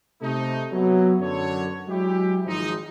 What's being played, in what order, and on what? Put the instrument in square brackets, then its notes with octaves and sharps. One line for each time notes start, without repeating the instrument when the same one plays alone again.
[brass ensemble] C3 A3 D#4
F#3 B3 E4
F#2 D3 C#5
F#3 G#3 E4 G4
G#1 F3 G#3 D#4